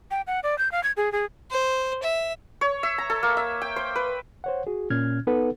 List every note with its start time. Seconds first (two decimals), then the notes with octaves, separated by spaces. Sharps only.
0.11 G5
0.27 F#5
0.43 D5
0.58 G6
0.72 F5
0.83 G#6
0.97 G#4
1.12 G#4
1.51 C5
2.03 E5
2.61 C#5
2.83 E5
2.98 A#5
3.10 A4
3.23 A#3
3.37 E5
3.62 G5
3.76 C5
3.96 B4
4.44 C5 C#5 F#5
4.67 F#4 G#4
4.90 A#2 C#4 F6 G#6
5.27 B3 D#4 A4 B4 F#5